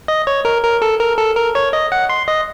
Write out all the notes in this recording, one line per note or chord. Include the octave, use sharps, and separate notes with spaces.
D#5
C#5
A#4
A#4
A4
A#4
A4
A#4
C#5
D#5
F#5
C6
D#5